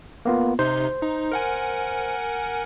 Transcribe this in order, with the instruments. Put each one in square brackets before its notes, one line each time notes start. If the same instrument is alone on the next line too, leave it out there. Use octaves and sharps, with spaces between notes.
[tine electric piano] A#3 B3 F4
[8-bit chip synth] C3 D#4 C6 [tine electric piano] C5
[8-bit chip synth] D#4
A#4 F#5 G#5